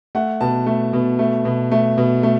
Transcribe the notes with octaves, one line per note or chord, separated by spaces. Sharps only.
A3 F#5
B2 A5
A3
B2
A3
B2
A3
B2
A3